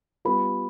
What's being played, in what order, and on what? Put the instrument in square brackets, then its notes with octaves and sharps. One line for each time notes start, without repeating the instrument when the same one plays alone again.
[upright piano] G3 B3 F4 [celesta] B5